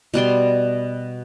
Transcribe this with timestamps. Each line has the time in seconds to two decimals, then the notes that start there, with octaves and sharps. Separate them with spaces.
0.14 B2 G3 D5 C6